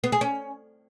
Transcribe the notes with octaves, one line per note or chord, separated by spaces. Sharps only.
B3
G#4
C#4